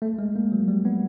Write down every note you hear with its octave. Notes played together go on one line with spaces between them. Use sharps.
A3
G#3
A#3
F#3
G3
B3